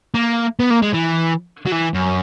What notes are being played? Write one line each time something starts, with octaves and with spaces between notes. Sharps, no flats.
A#3
B3
A#3
G#3
E3
F#3
E3
F#2